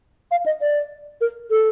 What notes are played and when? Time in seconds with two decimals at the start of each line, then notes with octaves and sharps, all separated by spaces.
0.31 F5
0.46 D#5
0.61 D5
1.21 A#4
1.51 A4